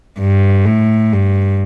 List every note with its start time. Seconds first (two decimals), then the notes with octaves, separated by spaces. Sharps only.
0.19 G2
0.66 A2
1.12 G2